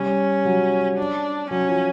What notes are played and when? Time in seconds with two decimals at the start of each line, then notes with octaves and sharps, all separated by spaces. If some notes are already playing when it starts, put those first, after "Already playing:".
Already playing: G3 C#4
0.45 F#3
0.98 D4
1.51 F#3 C#4
1.69 F3